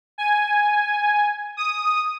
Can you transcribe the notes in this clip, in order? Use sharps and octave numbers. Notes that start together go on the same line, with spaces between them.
G#5
D#6